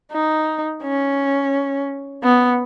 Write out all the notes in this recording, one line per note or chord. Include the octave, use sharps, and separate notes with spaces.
D#4
C#4
B3